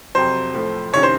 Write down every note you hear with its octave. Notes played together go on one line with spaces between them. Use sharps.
F2 C3 F#3 C5
A2 F3 A3
C2 C3 D#3 A#3 C#4 C#5
C5